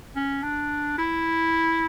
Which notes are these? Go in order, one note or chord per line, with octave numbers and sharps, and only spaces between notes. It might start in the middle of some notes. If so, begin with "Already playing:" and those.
C#4
D4
E4